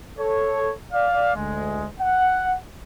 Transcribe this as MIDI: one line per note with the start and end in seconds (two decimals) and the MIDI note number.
0.18 0.72 69
0.18 0.72 73
0.93 1.35 74
0.93 1.35 77
1.35 1.87 38
1.35 1.87 56
2.00 2.54 78